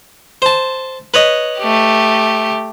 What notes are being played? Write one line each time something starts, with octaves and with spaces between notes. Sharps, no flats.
C5 A5
B4 C#5 D#5
A3 G4